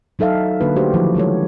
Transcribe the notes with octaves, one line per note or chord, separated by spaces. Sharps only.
F#3 D#4 A4 E5 F5
D3 A#3 D4 F#4 B4
A3 D4 F#4 G4 C5
D3 D#3 F3 F#3 E4
G#3 E4 A4 C#5